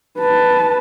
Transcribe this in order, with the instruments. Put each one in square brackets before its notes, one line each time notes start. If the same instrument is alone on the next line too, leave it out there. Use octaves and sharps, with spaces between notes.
[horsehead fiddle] B4 A5